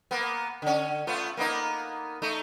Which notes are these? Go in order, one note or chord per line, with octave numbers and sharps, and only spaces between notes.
A#3 B3
D3 C#4
A3 B3 F4
A#3 B3 D#4
A3 D#4